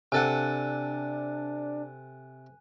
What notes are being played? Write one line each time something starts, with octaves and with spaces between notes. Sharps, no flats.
C3 D4 A4 F#5 G#5 F#6 D#7